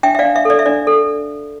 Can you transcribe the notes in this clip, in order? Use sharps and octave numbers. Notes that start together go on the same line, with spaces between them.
D4 E5 G5
E5
D5 F5
D4
E5
A4 D5
E5
D4 D5
A4